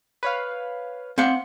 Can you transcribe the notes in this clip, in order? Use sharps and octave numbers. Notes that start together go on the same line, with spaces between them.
B4 C#5 F5
C4 F5 F#5